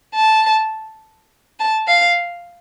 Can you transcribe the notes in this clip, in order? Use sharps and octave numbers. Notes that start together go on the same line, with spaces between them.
A5
A5
F5